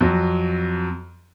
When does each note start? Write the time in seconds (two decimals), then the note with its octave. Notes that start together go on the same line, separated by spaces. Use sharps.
0.01 F2 F#3